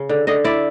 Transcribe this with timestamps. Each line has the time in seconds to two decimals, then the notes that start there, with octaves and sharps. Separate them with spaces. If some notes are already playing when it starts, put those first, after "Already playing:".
Already playing: C#3
0.09 D3
0.27 D3 D#5
0.44 E4 D5